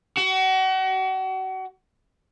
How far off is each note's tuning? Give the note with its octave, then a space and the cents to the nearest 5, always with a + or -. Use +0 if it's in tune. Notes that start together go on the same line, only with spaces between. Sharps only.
F#4 +35